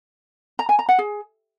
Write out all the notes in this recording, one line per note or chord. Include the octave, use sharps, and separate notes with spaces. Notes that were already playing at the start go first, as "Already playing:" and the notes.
A#5
G#5
A#5
F#5
G#4